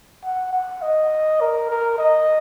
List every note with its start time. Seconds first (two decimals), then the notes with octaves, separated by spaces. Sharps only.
0.24 F#5
0.53 F#5
0.82 D#5
1.41 A#4
1.70 A#4
1.98 D#5